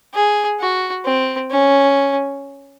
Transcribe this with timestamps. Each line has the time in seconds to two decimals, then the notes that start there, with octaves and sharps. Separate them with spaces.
0.14 G#4
0.60 F#4
1.05 C4
1.51 C#4